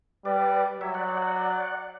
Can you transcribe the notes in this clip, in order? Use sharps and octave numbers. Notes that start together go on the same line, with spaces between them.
G3 B4 D5
F#3 C#5 E5
D5 F#5
D5 F#5
D5 F#5
D5 F#5